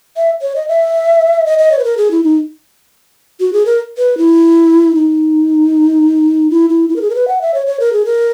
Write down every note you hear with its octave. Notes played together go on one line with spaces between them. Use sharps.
E5
C#5
D#5
E5
D#5
D#5
C#5
B4
A#4
G#4
E4
D#4
F#4
G#4
A#4
B4
E4
D#4
E4
E4
E4
A#4
G#4
A#4
B4
F#5
E5
C#5
C#5
A#4
G#4
A#4